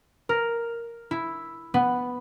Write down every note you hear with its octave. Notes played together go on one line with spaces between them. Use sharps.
A#4
E4
B3